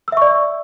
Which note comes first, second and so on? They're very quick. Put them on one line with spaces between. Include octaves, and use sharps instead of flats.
E6 E5 C#6 D5